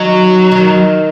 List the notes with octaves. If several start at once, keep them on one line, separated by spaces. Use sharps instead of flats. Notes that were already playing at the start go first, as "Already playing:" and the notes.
Already playing: D#3 F#3
D#3